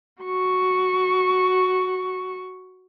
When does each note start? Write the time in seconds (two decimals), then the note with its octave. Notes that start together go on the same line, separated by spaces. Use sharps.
0.22 F#4 C#6